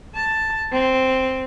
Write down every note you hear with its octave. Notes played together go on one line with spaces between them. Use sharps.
A5
C4